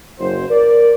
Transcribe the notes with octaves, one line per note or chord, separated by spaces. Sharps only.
F#1 C5
A#4 D5